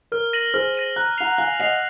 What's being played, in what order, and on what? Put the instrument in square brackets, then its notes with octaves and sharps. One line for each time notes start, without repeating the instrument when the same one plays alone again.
[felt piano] A#4 [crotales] F6
[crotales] A#6 D#7 F#7
[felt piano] G#4 C5 [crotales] F6
[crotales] A#6 D#7 F#7
[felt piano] A#5 [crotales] F#6
[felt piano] F#5 A#5 [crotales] C7 F7
[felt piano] F5 G#5 [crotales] F#6
[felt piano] D#5 F#5 [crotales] C7 F7